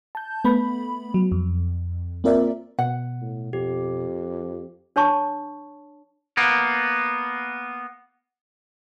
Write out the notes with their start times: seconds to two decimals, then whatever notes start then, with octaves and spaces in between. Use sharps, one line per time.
0.15 A5 G6
0.45 A3 B3 B5
1.14 F#3
1.32 F2
2.24 A#3 C4 F4 A#4 D5 E5
2.79 B2 F#5
3.22 A2
3.53 F2 G4
4.96 D4 C#5 A5 C#6
6.37 A#3 B3